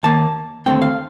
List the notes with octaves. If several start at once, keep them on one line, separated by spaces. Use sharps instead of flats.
D#2 D#3 A#3 A5
D#2 D3 F3 A3 C4 G5
F5